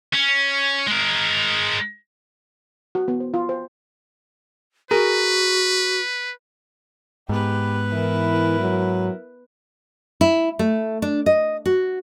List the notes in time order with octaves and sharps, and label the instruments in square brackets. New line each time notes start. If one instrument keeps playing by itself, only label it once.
[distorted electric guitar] C#4
G#3 A#4
[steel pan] F#4
B3
C5
F4
C5
[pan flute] F#4 [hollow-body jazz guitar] G#4 A#4 [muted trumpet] B4
[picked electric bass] G#2 [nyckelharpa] B3 B4 [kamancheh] G4
[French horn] E3 [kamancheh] E4 A#4
[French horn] F#3
[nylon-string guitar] E4
A3
D4
D#5
F#4